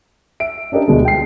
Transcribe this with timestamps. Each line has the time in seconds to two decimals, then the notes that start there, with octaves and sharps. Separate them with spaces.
0.40 E5 D7
0.72 C#4 D4 G4 A#4 D#5
0.88 D2 B2 G#3
1.05 G5 C7